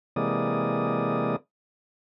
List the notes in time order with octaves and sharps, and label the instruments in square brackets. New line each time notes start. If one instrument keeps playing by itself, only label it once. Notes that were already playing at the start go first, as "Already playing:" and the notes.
[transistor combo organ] C3 E3 G#3 A#3 D5 D#6